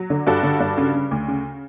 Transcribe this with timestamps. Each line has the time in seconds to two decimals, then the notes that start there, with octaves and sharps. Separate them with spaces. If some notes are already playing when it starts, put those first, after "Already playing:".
Already playing: F#3
0.10 D3
0.27 G2 F#4 A4
0.43 D3
0.60 G2
0.78 C#3
0.94 C#3
1.11 D2
1.28 C#3